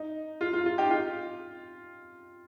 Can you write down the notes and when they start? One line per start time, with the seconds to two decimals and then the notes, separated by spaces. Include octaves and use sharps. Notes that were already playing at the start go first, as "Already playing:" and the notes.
Already playing: D#4
0.41 F4
0.53 F4
0.66 F4
0.78 D#4 G4
0.90 F4